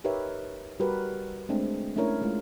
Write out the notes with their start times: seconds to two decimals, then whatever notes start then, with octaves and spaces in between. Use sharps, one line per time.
0.04 D#4 G4 A#4 B4 C#5 E5
0.80 G3 F#4 G4 A#4 B4
1.49 G#3 A3 C4 D4
1.96 A3 C#4 D4 E4 A#4 C#5
2.22 G#3 A3 F4